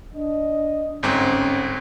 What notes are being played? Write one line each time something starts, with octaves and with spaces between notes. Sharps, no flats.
D4 D#5
G1 G#2 C4 C#4